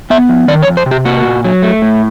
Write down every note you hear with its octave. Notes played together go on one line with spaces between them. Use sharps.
B3 E5
F3
D#3 D5
C#5
F2
C5
C3
G4
A#3 F#4
A#2
F#3
A3
A2